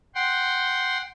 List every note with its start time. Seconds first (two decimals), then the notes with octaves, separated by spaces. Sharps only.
0.15 F#5 G5 C6